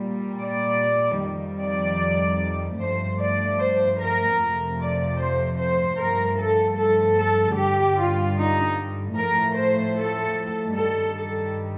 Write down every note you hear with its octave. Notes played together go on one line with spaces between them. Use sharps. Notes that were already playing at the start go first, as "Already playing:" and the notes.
Already playing: A#2 G3
D5
F2 D#3 G3
D5
G2 F3 A3 C5
D5
C5
A#4
F2 C3 F3 A3
D5
C5
C5
G2 F3 A3 A#4
A4
A4
A4
G2 D3 G3 G4
F4
D#4
A2 F3 A3 A#4
C5
A4
G2 D#3 G3 A4
A4